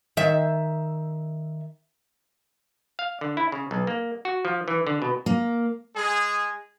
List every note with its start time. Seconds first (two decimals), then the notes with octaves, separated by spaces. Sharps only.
0.17 D#3 E5
2.99 F5
3.21 D3
3.37 E4
3.52 C#3
3.71 B1
3.87 A#3
4.25 F#4
4.45 F3
4.68 E3
4.87 D3
5.02 B2
5.26 A#3
5.95 G#3 G#4